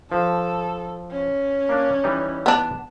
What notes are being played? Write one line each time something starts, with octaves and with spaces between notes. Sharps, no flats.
F3 A4
C#4
A#3 D4
E3 G3 D#4
B3 D4